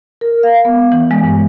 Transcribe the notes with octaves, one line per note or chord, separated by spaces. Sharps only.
A#4
F5
B3
E3
G#3
G2